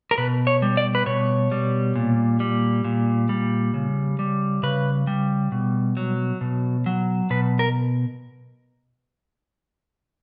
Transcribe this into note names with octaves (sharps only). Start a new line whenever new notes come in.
A#4
B2 B4
C#5
G3
D5
B4
B2 C#5
G3
A#2
G3
A#2
G3
C#3
G3
C#3 B4
G3
B2
F#3
B2
F#3
B2 B4
A#4